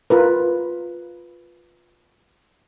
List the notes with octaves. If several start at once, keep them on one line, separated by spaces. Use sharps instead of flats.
F4 A#4 B4